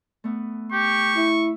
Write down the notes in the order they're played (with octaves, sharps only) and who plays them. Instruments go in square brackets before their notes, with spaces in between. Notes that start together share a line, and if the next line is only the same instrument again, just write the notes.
[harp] A3 B3
[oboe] G4 [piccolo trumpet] C#6
[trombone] E4 [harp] E5